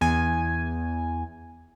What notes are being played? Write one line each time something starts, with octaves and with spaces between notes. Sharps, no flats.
E2 G#5